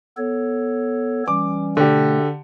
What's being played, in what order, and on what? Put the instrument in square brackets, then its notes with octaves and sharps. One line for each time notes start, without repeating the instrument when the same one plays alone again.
[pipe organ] B3 A4 C#5
[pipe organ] E3 G3 C#4 [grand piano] D6
[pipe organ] B2 A3 [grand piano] D3 G4